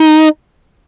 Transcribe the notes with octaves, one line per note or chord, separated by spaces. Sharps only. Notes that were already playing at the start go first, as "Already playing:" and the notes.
Already playing: D#4